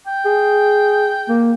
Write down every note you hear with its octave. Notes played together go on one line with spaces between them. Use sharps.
G5
G#4
A#3